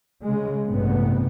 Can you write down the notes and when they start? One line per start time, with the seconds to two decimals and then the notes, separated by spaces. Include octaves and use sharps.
0.22 C#3 G#3
0.68 A1 G2 C3 B3